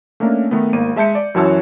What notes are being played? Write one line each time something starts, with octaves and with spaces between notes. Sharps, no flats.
A3 A#3 C#4 D4 A#4
D#3 A3 B3
G#1 A#3 D#7
G#3 E5 A5 G6 C#7
D5
F#2 E3 F#4 C#5 A5 E6